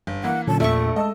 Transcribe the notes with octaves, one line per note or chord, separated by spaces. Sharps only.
G1
E3 A#3 F#5
A#2 D3 F#3 C#4 A5
A#1 E2 A#2 A3 E5 C#6
G#3 D#5 A5 E6